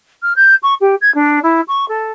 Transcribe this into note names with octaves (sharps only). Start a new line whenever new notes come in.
F6
G6
C#6
G4
G#6
D4
E4
C#6
A4